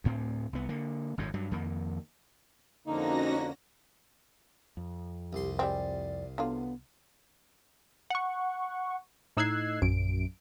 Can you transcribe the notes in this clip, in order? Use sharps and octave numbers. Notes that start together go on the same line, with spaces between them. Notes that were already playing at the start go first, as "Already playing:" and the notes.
D2 A2 C4
C2 B3
D3 A#3
G#1 F#2 A2
G2 F#3
F2 D#3 A#3
F2 D3 A#3 C#4 D#4 F#4 A#6
F2
C2 G4 C6
G3 G#3 C4 D5
D3 F#3 B3 F4
F#5 C#6
A2 D#4 E6 F#6 G#6 C7
A#1 F#2 D7